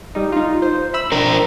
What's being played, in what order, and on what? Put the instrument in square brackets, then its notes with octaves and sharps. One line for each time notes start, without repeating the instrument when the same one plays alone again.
[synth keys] G3 D#4
D#4 F4
C5
E5 B5 E6
[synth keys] C4 [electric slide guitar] D4 A#4